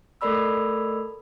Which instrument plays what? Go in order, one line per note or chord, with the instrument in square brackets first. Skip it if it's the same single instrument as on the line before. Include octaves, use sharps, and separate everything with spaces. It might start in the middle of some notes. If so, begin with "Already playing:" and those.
[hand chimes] A3 A4 A#4 D5 B5 E6